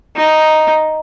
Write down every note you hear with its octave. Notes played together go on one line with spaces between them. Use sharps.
D#4